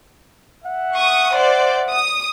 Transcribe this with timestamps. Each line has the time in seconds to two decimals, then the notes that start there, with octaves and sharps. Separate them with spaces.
0.64 E5 F#5
0.95 C#6 D#6
1.35 C5 D5
1.91 D#6